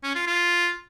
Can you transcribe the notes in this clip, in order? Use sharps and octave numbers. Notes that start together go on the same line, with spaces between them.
C#4
F4
F4